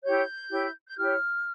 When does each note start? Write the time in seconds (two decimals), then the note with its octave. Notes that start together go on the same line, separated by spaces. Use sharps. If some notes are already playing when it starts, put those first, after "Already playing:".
0.04 E4 G4 C#5 G6
0.51 E4 G4 C#5
0.88 G6
0.98 E4 G4 C#5 F6